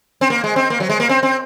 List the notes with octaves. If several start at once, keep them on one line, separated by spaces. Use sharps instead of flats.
C4
A#3
G#3
C4
A#3
F#3
G#3
A#3
C4
C4